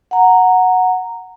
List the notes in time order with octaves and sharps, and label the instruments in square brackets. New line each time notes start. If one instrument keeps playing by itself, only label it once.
[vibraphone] F#5 A#5